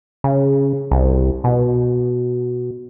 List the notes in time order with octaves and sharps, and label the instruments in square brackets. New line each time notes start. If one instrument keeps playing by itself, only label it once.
[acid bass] C#3
C2
B2